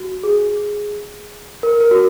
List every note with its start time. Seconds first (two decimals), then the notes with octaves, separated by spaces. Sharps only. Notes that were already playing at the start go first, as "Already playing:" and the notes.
Already playing: F#4
0.23 G#4
1.63 A#4
1.80 A#4
1.91 F#4